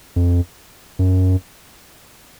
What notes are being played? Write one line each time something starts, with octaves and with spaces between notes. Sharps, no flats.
F2
F#2